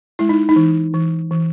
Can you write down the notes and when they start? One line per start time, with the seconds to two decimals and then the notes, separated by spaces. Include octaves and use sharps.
0.19 G#3 E4
0.29 D#4
0.49 D#4
0.56 E3
0.94 E3
1.31 E3